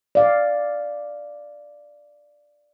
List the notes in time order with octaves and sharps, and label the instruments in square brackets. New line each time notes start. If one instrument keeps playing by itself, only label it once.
[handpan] D5 F5